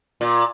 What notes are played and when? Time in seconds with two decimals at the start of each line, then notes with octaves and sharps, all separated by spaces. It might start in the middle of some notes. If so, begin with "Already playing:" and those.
0.21 A#2